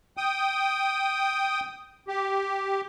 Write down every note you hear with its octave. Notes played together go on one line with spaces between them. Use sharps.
G5 D#6
G4